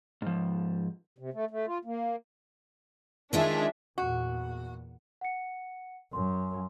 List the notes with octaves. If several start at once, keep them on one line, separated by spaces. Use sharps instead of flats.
G#2 F3
C3
A3
A3
F4
A#3
D#3 G#3 D4 F4 G#4 E5
E2 A#2 F#4
F#5 C#7
F#2 C6